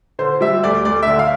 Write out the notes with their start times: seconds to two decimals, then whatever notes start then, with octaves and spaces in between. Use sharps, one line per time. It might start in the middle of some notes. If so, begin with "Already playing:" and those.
0.19 D3 C5
0.41 G3 E5
0.64 D2 D5
0.85 D2 D5
1.03 D3 E5
1.19 F5